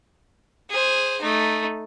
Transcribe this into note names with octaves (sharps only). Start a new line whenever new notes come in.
G#4 C5
A3 D#4